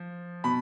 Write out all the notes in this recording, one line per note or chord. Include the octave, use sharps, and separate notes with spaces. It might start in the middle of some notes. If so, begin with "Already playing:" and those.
Already playing: F3
B2 B5